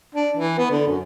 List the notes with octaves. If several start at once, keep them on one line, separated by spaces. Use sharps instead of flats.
D4
E3
B3
D3
F#2